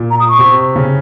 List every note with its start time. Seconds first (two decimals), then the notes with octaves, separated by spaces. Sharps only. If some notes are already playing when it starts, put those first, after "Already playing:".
Already playing: A#2
0.11 A#5
0.20 D#6
0.29 C#6
0.39 C3
0.76 C#3